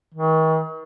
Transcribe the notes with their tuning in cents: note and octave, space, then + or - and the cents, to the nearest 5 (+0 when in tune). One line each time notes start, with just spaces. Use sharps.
D#3 +40